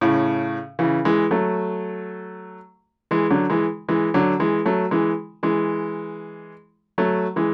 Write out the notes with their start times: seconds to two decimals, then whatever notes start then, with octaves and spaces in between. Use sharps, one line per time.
0.01 A2 C#3
0.79 C#3 E3
1.05 E3 G#3
1.31 F#3 A3
3.11 E3 G#3
3.30 D3 F#3
3.50 E3 G#3
3.89 E3 G#3
4.14 D3 F#3
4.40 E3 G#3
4.65 F#3 A3
4.91 E3 G#3
5.43 E3 G#3
6.98 F#3 A3
7.36 E3 G#3